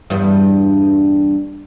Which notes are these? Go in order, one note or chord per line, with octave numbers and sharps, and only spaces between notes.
E2 G2